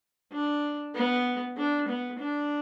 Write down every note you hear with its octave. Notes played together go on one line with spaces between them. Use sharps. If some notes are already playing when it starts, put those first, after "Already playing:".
D4
B3
D4
B3
D4